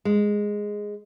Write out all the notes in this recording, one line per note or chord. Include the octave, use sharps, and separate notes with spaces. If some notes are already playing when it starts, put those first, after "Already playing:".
G#3